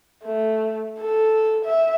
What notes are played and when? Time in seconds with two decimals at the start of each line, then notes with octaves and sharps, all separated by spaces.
0.24 A3
0.99 A4
1.65 E5